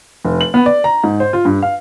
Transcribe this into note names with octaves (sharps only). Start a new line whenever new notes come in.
F1
F#7
B3
D5
A#5
G#2
C5
F4
G2
F5